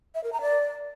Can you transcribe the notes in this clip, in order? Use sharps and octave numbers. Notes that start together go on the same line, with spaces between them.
E5
A#4
A#5
D5